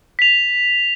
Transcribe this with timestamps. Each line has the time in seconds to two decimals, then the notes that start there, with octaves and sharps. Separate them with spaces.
0.19 B6 F7